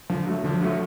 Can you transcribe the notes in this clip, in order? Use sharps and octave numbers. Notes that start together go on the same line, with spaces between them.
D3 F3
F#3 A3
D3 F3
F#3 A3